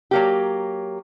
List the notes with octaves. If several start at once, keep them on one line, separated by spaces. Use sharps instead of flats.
F#3 A#3 G4